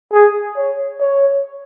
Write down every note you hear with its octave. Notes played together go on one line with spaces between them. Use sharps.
G#4
C#5
C#5